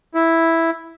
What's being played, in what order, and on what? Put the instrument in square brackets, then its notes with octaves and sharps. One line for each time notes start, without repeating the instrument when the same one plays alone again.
[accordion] E4